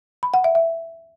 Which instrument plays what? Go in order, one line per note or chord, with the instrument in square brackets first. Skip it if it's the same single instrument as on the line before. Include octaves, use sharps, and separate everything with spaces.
[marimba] B5
F#5
E5
E5